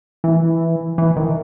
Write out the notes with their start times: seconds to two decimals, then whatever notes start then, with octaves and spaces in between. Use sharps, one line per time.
0.24 E3
0.98 E3
1.17 D#3